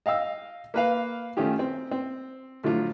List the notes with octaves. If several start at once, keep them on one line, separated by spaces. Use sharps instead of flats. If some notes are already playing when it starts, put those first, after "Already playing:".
D#5 F5 G5 E6
A#3 B4 F5
D#3 A3 C#4 F4 G4
C4
C4
A2 D3 F3 F#3 A3 F4